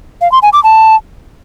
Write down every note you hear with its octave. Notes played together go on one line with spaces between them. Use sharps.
F5
C6
G#5
D6
A5